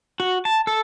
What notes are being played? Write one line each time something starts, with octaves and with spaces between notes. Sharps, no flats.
F#4
A5
A4